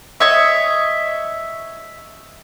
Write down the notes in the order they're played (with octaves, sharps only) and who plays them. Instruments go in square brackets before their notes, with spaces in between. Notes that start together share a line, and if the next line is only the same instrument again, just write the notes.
[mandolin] C#5 D#5 E5